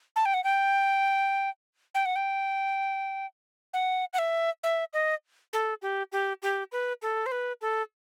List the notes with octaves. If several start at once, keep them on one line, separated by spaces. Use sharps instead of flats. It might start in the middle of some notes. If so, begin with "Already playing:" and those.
A5
G5
F#5
G5
G5
F#5
G5
F#5
F#5
E5
E5
D#5
A4
G4
G4
G4
B4
A4
C5
B4
A4